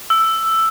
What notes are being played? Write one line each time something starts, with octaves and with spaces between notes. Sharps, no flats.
E6